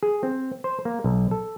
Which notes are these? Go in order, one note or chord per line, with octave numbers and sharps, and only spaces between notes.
G#4
C4
C5
A#3
B1
A4